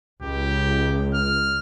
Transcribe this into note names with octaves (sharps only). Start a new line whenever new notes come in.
C#2 G4
F6